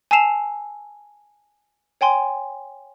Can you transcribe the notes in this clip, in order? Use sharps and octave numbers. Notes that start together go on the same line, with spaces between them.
G#5 A5 E6 C7 E7 F7
C#5 G5 G#5 C6